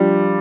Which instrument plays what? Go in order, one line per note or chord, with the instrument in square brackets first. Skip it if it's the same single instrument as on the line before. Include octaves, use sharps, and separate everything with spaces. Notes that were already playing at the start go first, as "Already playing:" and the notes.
Already playing: [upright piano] F3 D4 F4 [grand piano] G3